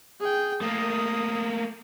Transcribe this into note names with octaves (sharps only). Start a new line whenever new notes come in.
G#4 G5
A3 A#3 A#4 D#6